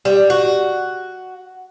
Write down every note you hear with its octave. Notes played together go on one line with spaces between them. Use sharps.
G3
F#4